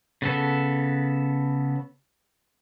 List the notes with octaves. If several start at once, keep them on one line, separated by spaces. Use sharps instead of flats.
C#3 B3 A4